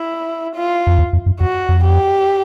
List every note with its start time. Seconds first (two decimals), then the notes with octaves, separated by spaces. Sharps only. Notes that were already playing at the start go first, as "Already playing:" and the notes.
Already playing: E4
0.56 F4
0.87 F2
0.99 E2
1.13 F2
1.26 F#2
1.40 F2 F#4
1.69 F2
1.84 G4